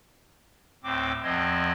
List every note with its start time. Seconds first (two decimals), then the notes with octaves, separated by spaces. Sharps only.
0.83 D2 A2 C4 D6
1.23 E2 F3 C4 D#5 G#6